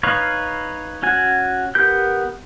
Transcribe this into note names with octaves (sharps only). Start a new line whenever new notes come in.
D#4 B4 C#5 F5
C#4 F#4 G#5
B3 G4 A#4 G6